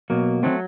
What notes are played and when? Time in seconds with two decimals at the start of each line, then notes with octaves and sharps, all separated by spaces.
0.10 B2 F#3 A#3
0.43 D#3 F#3 A3 C4